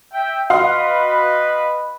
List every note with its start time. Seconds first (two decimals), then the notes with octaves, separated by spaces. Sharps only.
0.13 E5 G5
0.50 F#4 B4 D#5 F5 C6